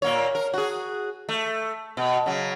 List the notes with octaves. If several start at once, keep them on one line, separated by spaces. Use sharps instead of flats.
A#2 A#3 C#5
A#4
F#4 G#4
A3
B2
C#3 F#3